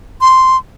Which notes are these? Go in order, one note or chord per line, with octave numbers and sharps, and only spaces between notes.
C6